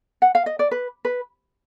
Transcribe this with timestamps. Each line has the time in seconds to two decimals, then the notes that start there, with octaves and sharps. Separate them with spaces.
0.22 F#5
0.35 F5
0.46 D#5
0.59 D5
0.71 B4
1.05 B4